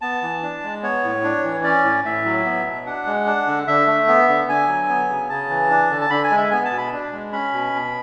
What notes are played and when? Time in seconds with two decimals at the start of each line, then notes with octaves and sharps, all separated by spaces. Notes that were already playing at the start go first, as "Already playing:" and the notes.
0.01 B3 A5
0.22 E3
0.43 D4
0.63 G#3
0.83 B3 C#5
1.04 A2
1.24 D4
1.44 E3
1.64 C#4 D5
1.84 A2
2.04 A2 E5
2.25 F#3
2.45 B3
2.66 B2
2.86 D4 F#5
3.06 G#3
3.26 D4
3.47 D3
3.67 D3 E5
3.87 A3
4.08 B3
4.28 D3
4.48 D3 G#5
4.68 F#3
4.89 B3
5.09 C#3
5.29 C#3 A5
5.50 E3
5.70 D4
5.90 D3
6.01 A5
6.10 D3 B5
6.24 G#5
6.31 G#3
6.37 E5
6.51 B3 G#5
6.65 A5
6.71 B2
6.78 B5
6.92 D4
7.12 G#3
7.33 C#4 B5
7.53 B2
7.73 B2